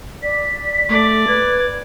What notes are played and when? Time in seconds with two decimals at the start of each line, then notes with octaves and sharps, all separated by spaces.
0.23 D5 B6
0.89 A3 D5
1.28 B4 G#6